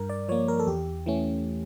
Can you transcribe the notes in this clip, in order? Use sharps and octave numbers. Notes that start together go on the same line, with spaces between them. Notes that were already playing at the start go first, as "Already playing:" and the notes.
Already playing: G2 A#4
D5
F3 A#3 C#5
A#4
A4
E2 G4
E3 A3 C#4